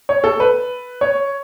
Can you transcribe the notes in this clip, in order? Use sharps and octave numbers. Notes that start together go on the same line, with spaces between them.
C#5
A4
B4
C#5